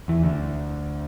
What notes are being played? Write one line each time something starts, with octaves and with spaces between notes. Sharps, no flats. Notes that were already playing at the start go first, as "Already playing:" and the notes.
E2 E3
D2 D3